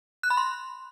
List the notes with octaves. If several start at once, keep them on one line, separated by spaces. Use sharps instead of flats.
F#6
B5
C6